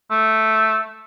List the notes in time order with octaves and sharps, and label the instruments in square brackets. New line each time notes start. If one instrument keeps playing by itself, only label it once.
[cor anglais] A3